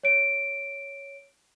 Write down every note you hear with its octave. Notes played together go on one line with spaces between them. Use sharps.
C#5 D7